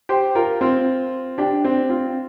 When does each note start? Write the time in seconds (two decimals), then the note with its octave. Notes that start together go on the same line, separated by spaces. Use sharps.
0.09 G4 C5
0.35 F4 A#4
0.61 C4 F4
1.38 D4 G4
1.64 C4
1.89 C4 F4